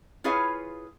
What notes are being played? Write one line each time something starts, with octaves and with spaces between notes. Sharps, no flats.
E4 F4 G#4 B4 C#5 F5